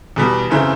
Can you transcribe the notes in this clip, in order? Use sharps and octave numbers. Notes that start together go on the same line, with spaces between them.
E2 B2 G3
F#2 C#3 E3 A3 C4